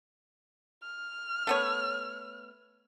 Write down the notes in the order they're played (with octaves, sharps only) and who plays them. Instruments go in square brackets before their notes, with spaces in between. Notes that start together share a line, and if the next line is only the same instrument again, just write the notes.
[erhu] F6
[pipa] A3 B3 C#5